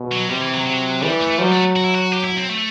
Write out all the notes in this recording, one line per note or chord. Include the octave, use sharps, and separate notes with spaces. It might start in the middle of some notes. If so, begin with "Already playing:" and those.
Already playing: B2
F#3
C3 G3
E3
F#3
F#3
E3 G3
A3
F#3 G3
A3
F#4
E4
F#4
G4
E4
C4
A3